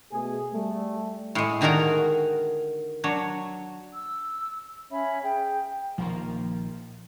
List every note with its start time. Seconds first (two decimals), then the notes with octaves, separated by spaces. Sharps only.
0.12 B2 A3 G#4
0.54 G3 A3
1.35 A2 G#3
1.61 D3 D#3 F#4 G#4 A#4 A#5
3.04 F#3 D4 C#5
3.95 E6
4.91 C#4 C#5 E5 B5
5.23 G#4 G5
5.98 A#1 D#3 F3 A#3